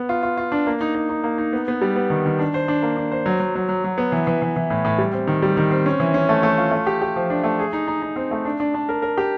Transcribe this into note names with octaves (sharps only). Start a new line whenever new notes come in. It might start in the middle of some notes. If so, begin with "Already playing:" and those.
Already playing: B3
F4
F4
F4
D4
A#3
D#4
D#4
D#4
A#3
D#4
B3
B3
G3
B3
D#3
D#3
D4
C5
D4
A#3
D4
C5
F#3
F#3
F#3
F#3
F#3
B3
E3
E3
E3
E3
A2
A2
G3
C4
D#3
G3
D#3
C4
C#4
E3
C#4
A3
A3
F4
A3
G4
G4
F3
D4
A3
G#4
D#4
D#4
D#4
C4
A3
D4
D4
D4
A#4
A#4
G4